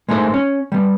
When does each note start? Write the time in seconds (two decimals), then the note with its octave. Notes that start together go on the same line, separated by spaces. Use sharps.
0.09 G#3 A3 D#4 F#4 A#4 C5
0.34 C#4
0.72 G3 B3